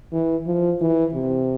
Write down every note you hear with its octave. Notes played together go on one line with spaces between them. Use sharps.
E3
F3
E3
C3